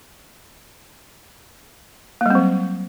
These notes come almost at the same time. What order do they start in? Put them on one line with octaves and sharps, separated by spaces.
A#3 G3 C4 F#3